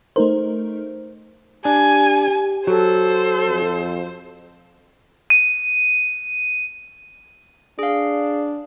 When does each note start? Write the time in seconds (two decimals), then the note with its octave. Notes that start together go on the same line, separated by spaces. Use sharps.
0.16 A3 D#4 A#4 C5
1.65 D4 G4 G#5
2.67 F#3 A4 C5
3.48 F2
5.30 D#7
7.79 D4 G#4 F5